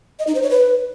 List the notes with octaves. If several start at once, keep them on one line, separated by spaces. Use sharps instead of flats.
D#5
D#4
C5
C#5
B4